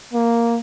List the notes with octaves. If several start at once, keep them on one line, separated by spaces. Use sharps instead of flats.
A#3